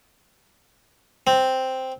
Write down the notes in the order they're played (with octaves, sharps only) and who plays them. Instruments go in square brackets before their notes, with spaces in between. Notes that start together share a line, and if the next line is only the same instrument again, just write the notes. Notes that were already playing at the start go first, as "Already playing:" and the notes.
[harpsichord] C4